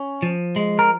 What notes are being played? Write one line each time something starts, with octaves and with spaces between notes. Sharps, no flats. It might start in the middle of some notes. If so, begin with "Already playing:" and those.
Already playing: C#4
F3
G#3
A#4